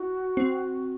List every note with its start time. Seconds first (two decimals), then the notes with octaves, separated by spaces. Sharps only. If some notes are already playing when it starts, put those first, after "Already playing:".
Already playing: E4 F#4
0.37 C4